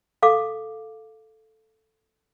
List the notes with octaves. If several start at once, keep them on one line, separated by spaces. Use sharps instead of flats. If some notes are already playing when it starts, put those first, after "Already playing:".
A4 F5 D6